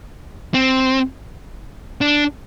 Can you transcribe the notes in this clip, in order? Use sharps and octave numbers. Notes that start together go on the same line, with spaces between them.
C4
D4